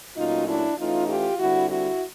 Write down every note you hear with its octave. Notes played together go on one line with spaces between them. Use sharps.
A#2 F#3 A3 C#4 D#4 F4
D4 E4
E3 A3 C#4 D#4 F4
F4 G4
D3 G3 C4 E4 F#4
E4 F#4